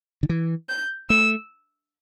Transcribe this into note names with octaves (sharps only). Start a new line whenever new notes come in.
D3
E3
G6
A3 E6